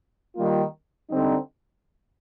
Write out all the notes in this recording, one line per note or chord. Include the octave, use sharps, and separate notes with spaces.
D#3 G3 A#3 F4
D3 G3 C4 D#4